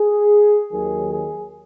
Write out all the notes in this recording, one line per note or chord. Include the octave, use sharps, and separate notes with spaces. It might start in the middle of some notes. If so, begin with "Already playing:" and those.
Already playing: G#4
D#2 D#3 F#3 G#4
G#4